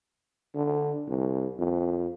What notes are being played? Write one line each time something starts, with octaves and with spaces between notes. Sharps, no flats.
D3
C2
F2